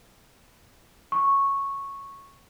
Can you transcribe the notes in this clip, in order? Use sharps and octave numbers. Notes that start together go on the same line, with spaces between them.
C#6